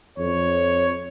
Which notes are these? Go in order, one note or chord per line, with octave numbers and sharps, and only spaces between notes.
F2 C#5